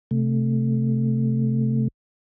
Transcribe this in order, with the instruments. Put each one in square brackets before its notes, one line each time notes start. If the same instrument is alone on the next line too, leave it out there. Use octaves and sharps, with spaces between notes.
[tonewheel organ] C3 A3